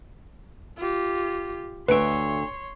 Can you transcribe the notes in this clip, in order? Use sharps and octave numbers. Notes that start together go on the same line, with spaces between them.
F4 G4
D2 B4 C#5 E5 C6 D7